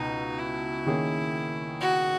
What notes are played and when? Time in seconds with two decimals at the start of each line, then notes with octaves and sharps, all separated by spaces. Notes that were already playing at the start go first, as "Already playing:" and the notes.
Already playing: C#2 B2 B3 D#4
0.39 E4
0.86 D#3 A#3 C#4 G#4
1.81 F#4